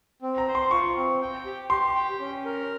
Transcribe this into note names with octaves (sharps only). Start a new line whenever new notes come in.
C4
A#5
C5
C6
F4 C#6
C4
G5
G4
G4 C6
G5
C#4
A#4